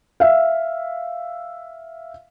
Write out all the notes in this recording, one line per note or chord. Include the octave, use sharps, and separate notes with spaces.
E5 F5